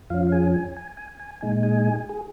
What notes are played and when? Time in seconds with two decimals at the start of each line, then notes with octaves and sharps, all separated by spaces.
0.10 F2 F3 C#4 F4 F5
0.27 F5
0.32 G#4 G#5
0.54 G#5
0.77 G#5
0.97 G#5
1.20 G#5
1.41 A#2 G#3 D#4 G#5
1.63 G#4 G#5
2.09 G#4